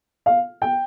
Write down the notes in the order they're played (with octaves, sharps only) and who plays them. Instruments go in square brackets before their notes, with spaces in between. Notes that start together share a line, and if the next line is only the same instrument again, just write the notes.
[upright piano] F5
G5